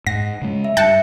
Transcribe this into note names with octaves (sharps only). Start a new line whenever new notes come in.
G#2 F#5 A#6
C#3 G#3
E5
G2 E5 G5 A5 F#6 C#7